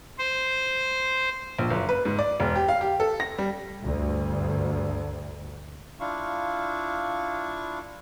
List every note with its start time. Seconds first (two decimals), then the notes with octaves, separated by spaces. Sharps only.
0.19 C5
1.59 A#1
1.70 F#1
1.89 B4
2.05 G#2
2.19 D5
2.40 E1
2.56 G4
2.69 F5
2.81 G4
3.00 A4
3.20 A#6
3.38 G3
3.83 D2 G2
6.00 D4 E4 F4 F5 C#6